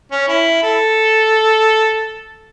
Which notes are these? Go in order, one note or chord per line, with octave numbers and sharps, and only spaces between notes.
C#4
E4
A4